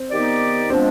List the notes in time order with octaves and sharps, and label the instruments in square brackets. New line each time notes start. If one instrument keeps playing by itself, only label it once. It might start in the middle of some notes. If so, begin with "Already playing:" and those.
Already playing: [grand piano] C4
[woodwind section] D#3 B3 D#4 G4 D5
[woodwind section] F3 G#3 B3 D4 [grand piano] C4